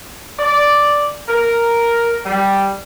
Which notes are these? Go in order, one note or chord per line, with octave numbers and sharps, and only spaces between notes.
D5
A#4
G3